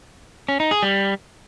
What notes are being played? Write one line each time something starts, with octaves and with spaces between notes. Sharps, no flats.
C#4
D#4
G#4
G3